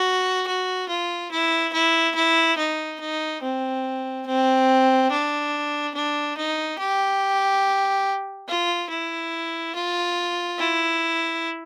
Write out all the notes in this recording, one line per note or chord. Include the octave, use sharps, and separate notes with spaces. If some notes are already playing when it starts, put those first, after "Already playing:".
Already playing: F#4
F#4
F4
E4
E4
E4
D#4
D#4
C4
C4
D4
D4
D#4
G4
F4
E4
F4
E4